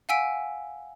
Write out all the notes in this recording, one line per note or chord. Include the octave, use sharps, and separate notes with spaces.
F5 F#5 G#5 E6 B6 D7